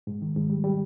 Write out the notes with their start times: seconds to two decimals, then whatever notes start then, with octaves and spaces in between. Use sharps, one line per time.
0.07 G#2
0.22 D#3
0.36 G#2
0.50 G3
0.64 G3